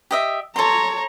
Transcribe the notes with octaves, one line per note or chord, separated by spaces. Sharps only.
G4 D#5 E5
A4 C#5 A#5 C6